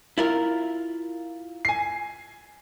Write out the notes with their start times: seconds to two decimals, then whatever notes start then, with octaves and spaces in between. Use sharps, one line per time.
0.18 E4 F4 A#4
1.65 G#5 C7